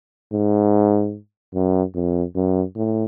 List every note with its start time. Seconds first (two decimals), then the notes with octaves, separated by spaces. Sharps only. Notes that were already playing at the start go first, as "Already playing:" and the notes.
0.33 G#2
1.55 F#2
1.95 F2
2.35 F#2
2.76 A2